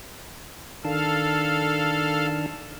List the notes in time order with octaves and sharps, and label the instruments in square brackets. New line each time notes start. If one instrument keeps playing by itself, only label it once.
[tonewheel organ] D#3 D4 A5 [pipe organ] A4 F5